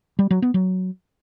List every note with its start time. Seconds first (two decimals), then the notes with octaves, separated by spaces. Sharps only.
0.19 G3
0.31 F#3
0.42 B3
0.54 F#3